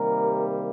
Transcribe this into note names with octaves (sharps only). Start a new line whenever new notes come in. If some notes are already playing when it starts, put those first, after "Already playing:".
Already playing: C3 D#3 G3 A#3 A#4